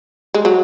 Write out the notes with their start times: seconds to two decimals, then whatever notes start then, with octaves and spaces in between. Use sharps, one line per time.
0.34 G#3
0.45 F#3